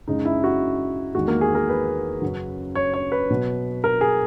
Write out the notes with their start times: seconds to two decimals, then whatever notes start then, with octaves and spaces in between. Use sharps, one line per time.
0.08 F#2 C#3 G#3 D#4
0.25 E4
0.44 F#4
1.15 E2 D#3 G#3 F#4
1.28 A#3
1.41 G#4
1.55 A#4
1.69 B4
2.22 F#2 C#3 F#3
2.75 C#5
2.94 C#5
3.12 B4
3.30 B2 F#3
3.84 A#4
4.01 G#4